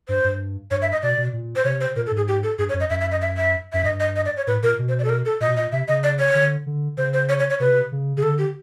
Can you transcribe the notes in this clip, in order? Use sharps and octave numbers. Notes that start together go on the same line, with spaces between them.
G2 C5
G2
G2 C#5
E5
D#5
B2 D5
B2
A#2
C5
C3 C#5
C5
A#2 A#4
A4
G#2
G#4
G4
A4
G2 G#4
C#5
F#2
D#5
F#2 E5
E5
D#5
E5
E5
F#2 E5
G2 D#5
D#5
D#5
D5
C#5
A2 B4
A#2 A#4
B2
C5
D5
A4
A#4
A4
A#2 D#5
B2
A#2 D#5
C3 E5
C#3 D#5
D5
C#5
D3
D3
C#3 C5
C5
C#5
C#5
C#5
C3 B4
C#3
C#3 G#4
D3 A4
G4